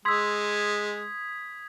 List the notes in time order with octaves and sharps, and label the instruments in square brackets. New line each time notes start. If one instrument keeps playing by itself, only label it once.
[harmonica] G#3 [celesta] C6 E6 [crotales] D#6 G#6 B6